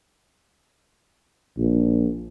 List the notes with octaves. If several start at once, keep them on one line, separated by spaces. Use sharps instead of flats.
A#1